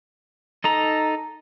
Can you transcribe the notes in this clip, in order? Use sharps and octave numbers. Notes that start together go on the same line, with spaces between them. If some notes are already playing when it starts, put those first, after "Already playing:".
D#4 A4 A#5